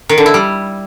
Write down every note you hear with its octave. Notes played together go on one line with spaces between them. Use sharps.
D#3
D3
E4
G3